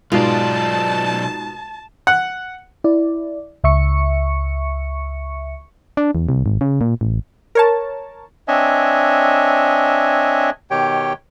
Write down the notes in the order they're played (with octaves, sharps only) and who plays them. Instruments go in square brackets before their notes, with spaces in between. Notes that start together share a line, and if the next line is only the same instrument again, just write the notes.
[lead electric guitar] B1 D5 [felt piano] G#2 B2 G#3 [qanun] F4 [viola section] A5
[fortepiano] F#5
[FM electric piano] E4 D5
C#2 E5 C#6 C#7
[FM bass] D4
E2
C2
G#1
C#3
A#2
A1
[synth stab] A#4 C#5 A5
[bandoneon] C4 D4 C#5 D#5 E5 G#5
B2 D#3 G4 C#5 G5